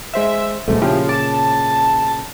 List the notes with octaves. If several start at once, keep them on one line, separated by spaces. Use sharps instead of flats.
G#3 C5 E5 E6
D#1 C2 G#2 B2 A3
A#2 C#3 F3 E4 G4 G#4
A5 D6